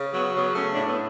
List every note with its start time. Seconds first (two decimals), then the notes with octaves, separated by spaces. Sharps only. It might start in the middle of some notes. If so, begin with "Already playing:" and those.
Already playing: C#3
0.14 F#3 B3
0.34 C#3 B3
0.55 A3 C#4
0.71 D4
0.76 A2
0.86 B3